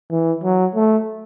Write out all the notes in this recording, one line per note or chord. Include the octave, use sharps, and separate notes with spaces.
E3
F#3
A3